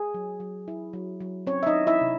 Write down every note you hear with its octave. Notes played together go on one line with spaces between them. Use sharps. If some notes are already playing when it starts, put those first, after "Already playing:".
Already playing: G#4
F#3
F#3
E4
F#3
F#3
C4 C#4 C#5
E5
D#4 D#5
E4
E4 E5
C3